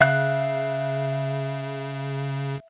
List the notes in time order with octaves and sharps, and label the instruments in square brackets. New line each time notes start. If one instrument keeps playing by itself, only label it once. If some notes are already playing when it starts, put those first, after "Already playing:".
[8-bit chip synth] C#3 [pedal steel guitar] E5 F5 F#6